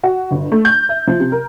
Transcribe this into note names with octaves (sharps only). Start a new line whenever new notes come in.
F#4
G1
A3
G6
E5
F3
C3
A#4